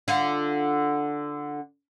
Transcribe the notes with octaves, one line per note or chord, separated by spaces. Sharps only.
D3 F4